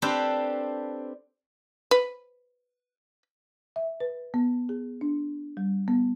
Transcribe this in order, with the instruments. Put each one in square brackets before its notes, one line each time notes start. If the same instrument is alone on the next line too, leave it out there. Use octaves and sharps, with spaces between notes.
[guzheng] C4 D4 G4 A4 B4 C5
[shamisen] B4
[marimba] E5
B4
B3
G#4
D4
G3
B3